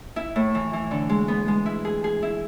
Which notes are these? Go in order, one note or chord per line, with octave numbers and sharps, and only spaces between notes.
E4
A2
E3
E3
D3
G#3
B3
G#3
E4
G#4
G#4
E4